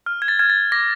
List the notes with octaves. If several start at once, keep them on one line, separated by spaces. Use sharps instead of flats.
F6
G#6
A6
F6 G#6
A6
D6 A#6